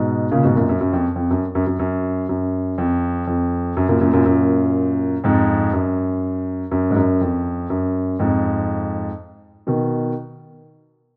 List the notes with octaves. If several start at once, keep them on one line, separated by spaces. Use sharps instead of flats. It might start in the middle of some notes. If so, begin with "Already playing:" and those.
Already playing: G#2 B2
A#2 C#3
G#2 B2
F#2 A#2
F#2
F#2
F2
F2
F#2
F#2
F#2
F#2
F#2
F2
F2
F#2
F#2 A#2
F#2 A#2
F#2 A#2
F#2 A#2
F2 G#2
F#2
F#2
G#2
F#2
F2
F#2
F2 G#2
B2 D#3